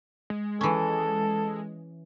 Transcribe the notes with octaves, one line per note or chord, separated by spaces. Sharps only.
G#3
E3 C#4 A4